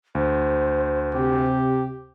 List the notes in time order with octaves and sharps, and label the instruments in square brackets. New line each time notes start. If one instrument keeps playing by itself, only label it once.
[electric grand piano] D2 [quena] C5
[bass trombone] C3 [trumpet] G4